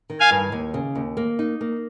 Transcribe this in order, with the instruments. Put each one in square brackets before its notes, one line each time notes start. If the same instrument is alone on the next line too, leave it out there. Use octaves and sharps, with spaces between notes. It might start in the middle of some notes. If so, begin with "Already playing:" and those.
[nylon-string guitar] D#3
[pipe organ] F5 G#5
[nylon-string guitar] G2
D#2
C#3
D#2
A#3
D#4
A#3